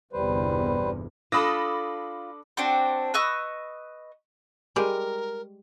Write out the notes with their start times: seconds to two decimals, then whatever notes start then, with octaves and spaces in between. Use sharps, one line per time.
0.13 G1 E2 C3 G3 B4 C5
1.32 D4 F4 A4 B5 D6 D#6 A#6
2.57 C4 D4 F#4 C5
3.14 B4 D#5 C#6 E6
4.76 G3 G#3 G4 A#4